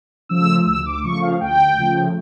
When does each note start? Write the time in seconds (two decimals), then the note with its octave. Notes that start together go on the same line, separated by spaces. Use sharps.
0.29 C#3 F3 A3 E6
0.66 D2 E6
0.86 D6
1.04 C#3 F3 A3 C#6
1.22 F5
1.41 D2 G5
1.78 C#3 F3 A3